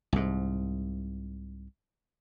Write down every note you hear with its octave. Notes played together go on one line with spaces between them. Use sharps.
C2 G#2